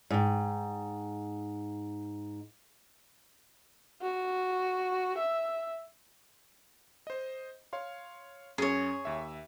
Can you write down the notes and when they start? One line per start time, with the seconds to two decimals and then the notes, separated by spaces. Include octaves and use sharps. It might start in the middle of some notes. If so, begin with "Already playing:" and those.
0.10 G#2 G5
4.02 F#4
5.18 E5
7.07 C5 D#5
7.73 C#5 F5 C6
8.58 F#2 C#4 G#4 C#5
9.05 D#2 E5